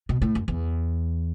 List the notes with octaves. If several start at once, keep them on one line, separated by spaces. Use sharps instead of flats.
B2
A2
F#2
E2